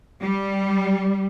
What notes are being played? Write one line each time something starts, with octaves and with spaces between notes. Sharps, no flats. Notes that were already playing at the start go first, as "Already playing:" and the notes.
G3